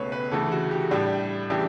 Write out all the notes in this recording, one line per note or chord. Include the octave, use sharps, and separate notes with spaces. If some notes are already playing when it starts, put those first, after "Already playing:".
Already playing: C#2 B2 A3 B4 C#5
B4
D2 C#3 E3 A3 A4
F#4
G4
A2 G3 D4
C#3 E3 G3 D4 G4